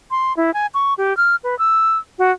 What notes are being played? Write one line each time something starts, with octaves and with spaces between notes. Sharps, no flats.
C6
E4
G#5
C#6
G4
F6
B4
E6
F#4